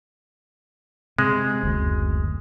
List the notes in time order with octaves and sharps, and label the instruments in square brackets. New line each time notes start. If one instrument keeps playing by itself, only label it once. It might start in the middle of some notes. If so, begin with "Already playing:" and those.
[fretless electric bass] C3 [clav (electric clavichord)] G#3
[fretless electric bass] F#1 D2